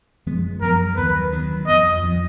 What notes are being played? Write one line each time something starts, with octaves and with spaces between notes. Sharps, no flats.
F#2 F3 G#3 B3
F#2 F3 G#3 B3 A#4
D#2 D#3 F#3 B3 B4
D#2 D#3 F#3 B3
F2 F3 B3 D#5
F2 F3 B3